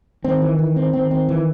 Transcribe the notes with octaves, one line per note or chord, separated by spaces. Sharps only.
D#3 C4
E3
E3
C4
D#3 C4
C4
E3